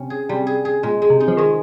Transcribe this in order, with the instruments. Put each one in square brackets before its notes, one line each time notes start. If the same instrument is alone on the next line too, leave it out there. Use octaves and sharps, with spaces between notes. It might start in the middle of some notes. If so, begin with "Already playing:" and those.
Already playing: [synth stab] C3 [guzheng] C4 C#4
[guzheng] G#4
[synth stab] C3 [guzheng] G3
[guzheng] G#4
G#4
[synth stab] A#2 [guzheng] G#3
[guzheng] G#3
[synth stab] C3
[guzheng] D#4
[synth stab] F3
[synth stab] D#3 [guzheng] G#3